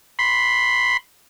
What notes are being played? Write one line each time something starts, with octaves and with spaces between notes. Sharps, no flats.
B5 C6